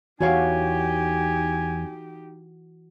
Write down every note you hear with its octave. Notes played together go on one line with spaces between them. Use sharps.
E2 E3 D#4 F#4 G4 C#5 F5 G#5